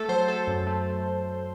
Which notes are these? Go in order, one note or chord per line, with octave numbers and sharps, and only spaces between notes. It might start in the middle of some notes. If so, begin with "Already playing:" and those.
Already playing: A3 A4
F#3 C5
A3 A4
F#2
A3
A3